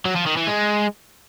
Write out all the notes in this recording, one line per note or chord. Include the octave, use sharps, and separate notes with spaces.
F#3
F3
D#3
E3
G#3